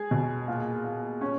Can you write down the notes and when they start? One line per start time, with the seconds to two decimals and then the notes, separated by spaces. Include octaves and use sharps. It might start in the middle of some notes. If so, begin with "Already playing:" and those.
Already playing: G#3 G#4
0.11 B2
0.48 A#2
0.84 A#2
1.21 A#2 C#4